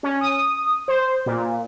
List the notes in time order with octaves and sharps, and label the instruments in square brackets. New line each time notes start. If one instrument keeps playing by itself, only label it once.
[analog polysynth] C#4
D#6
C5
A#2